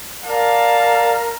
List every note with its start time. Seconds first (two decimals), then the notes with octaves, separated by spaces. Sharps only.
0.25 A#4 D5 F5 A5